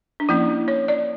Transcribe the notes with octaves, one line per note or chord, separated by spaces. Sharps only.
D4
F3 A#3 C#4 E4
C#5
D5